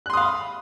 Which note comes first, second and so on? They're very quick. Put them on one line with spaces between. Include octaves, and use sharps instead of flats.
F#6 C6 D#6 F5 B5